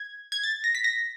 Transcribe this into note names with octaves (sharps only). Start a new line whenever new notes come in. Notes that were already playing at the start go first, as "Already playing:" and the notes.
Already playing: G#6
G#6
A6
A#6
B6
A#6